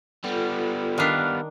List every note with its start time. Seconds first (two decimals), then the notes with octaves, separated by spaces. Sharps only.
0.24 G3 B3 F4 A4
0.98 D#3 D4 B4 F5